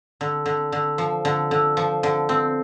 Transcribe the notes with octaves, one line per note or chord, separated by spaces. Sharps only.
D3
D3
D3
F3
D3
D3
F3
D3
C4